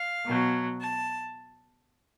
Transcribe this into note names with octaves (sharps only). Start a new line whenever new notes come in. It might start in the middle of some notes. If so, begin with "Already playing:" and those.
Already playing: F5
B2 F#3
A5